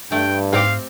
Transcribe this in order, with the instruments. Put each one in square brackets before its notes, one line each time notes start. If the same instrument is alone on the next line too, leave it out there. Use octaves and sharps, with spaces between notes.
[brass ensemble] G2 [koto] A3 [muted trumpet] G5
[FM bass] G#2 [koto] C4 G4 [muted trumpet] F5